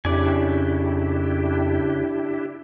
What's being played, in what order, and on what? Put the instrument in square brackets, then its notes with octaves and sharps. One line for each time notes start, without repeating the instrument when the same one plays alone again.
[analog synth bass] F2 [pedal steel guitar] C#3 D5 G#5 [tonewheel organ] D4 E4 G4